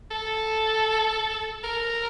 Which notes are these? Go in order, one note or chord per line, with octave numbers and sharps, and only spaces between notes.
A4
A#4